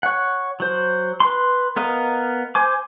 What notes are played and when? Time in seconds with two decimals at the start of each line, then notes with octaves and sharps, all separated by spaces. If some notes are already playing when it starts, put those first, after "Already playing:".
0.03 C#5 F#5
0.60 F#3 C5
1.20 B4 C6
1.76 B3 A#4 D#5 F5
2.55 C5 G#5 D6